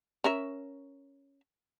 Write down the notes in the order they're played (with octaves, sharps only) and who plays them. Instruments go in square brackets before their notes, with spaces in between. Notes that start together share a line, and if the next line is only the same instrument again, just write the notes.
[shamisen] C#4 A#4 E5